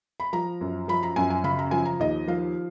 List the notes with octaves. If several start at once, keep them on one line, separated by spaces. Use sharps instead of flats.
B5
F3 A#5
F#2
F3 B5
A#5
F#2 G#5
G#5
C#3 B5
A#5
F3 G#5
A#5
D#2 D#5
F3 F5